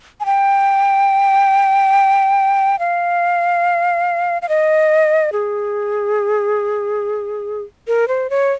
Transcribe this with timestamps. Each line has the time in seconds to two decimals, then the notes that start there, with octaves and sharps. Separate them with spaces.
0.20 G#5
0.26 G5
2.79 F5
4.42 F5
4.49 D#5
5.33 G#4
7.88 A#4
8.08 C5
8.30 C#5